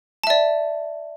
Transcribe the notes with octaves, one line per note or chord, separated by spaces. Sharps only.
D5 E5 A5